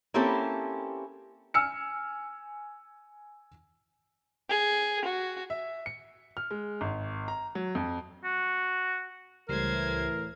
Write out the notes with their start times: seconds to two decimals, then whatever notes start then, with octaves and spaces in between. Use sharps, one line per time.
0.14 A#3 C4 C#4 E4 G4 A4
1.54 G#5 E6 F6 C#7
4.50 G#4
5.05 F#4
5.50 E5
5.86 C#7
6.37 F6
6.51 G#3
6.81 G#1
7.28 A#5
7.55 F#3
7.75 F2
8.24 F#4
9.49 C#2 A2 E3 G3 A#4 C5 G#6 C7